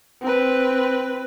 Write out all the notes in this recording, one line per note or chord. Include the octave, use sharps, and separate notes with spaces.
C4 B4